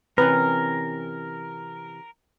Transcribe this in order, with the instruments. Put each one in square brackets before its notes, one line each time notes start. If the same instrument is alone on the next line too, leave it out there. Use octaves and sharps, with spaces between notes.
[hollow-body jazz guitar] C3 E3 C#4 [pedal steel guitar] A#4 [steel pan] B4